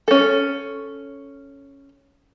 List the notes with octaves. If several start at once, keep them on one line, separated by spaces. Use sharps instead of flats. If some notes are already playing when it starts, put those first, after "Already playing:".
C#4 A4